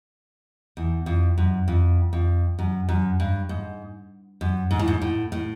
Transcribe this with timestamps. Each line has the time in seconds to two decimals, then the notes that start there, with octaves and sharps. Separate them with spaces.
0.77 E2
1.06 F2
1.38 F#2
1.68 F2
2.13 F2
2.59 F#2
2.89 F#2
3.20 G2
3.49 G#2
4.41 F#2
4.71 G#2
4.79 A2
4.88 G#2
5.02 A2
5.32 A2